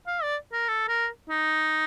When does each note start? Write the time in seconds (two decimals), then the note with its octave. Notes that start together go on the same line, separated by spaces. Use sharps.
0.07 F5
0.23 D5
0.53 A#4
0.68 A4
0.89 A#4
1.30 D#4